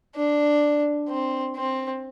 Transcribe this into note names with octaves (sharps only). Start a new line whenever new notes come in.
D4
C4
C4